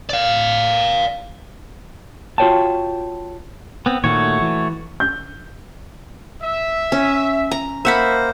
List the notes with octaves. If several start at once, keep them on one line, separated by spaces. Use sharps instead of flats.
D5 F5
F4 F#4 C5 C#5 G5 A5
B3 C4
A#2 D#3 A3 F#4 C#5
E3
G6
E5
C#4
A#5
A#3 C5 E5 F#5 B5